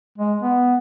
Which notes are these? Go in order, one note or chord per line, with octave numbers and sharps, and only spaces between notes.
G#3
B3